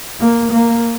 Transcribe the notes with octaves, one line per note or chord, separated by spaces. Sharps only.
A#3
A#3